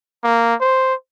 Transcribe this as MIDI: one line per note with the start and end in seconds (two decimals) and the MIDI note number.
0.24 0.55 58
0.61 0.94 72